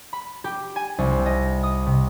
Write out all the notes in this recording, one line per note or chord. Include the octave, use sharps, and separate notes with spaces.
B5
G4
G#5
C2
C4
D#5
D#6
C3